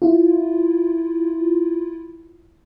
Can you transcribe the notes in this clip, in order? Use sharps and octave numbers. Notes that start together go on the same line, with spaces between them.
E4 F4